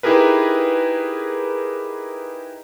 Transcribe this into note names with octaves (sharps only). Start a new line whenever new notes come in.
D#4 E4 G4 G#4 A#4 B4